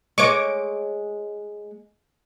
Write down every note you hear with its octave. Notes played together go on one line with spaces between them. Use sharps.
G#3 C#5 D#5 C#6 D6 D7